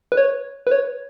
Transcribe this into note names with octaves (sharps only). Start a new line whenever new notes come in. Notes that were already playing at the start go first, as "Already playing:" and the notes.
B4
C#5
B4
C#5